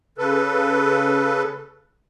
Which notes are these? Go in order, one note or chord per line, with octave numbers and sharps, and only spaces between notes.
C#3 A4 B4